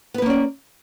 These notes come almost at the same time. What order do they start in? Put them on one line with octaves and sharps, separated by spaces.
B3 B4 A#3 C#4 D5